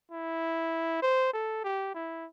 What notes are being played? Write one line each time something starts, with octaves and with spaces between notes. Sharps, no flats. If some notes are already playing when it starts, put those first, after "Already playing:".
E4
C5
A4
G4
E4